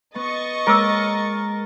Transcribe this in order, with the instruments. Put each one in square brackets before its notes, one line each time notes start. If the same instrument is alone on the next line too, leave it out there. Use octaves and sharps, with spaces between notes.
[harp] B3 [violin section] D#5 C#6 A6
[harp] G#3 A#3 [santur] A#4 [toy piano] C#5 D6 E6